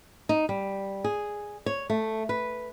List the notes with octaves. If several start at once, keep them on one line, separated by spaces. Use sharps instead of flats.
D#4
G3
G#4
C#5
A3
B4